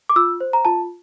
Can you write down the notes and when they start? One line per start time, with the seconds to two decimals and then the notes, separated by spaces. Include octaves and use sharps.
0.09 D6
0.16 F4 E6
0.41 C5
0.53 A#5
0.65 F4 A5